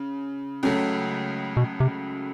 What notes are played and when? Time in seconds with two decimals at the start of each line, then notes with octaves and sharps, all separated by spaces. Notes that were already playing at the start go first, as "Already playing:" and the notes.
Already playing: C#3
0.63 C#2 C#3 F#3 A3
1.57 B2
1.80 C3